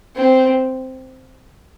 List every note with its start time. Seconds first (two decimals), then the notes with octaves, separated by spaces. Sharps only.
0.15 C4